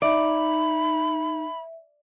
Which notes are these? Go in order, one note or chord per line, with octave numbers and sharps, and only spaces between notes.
D#4 D5 E5 B5